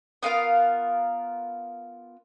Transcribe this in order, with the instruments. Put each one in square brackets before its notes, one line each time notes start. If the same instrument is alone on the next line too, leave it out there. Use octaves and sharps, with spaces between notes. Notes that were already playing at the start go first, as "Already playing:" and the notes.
[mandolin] B3 F4 A#4 F5